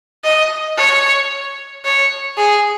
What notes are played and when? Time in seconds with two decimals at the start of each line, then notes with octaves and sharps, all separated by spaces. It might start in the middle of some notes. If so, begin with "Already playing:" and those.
0.24 D#5
0.77 C#5
1.85 C#5
2.38 G#4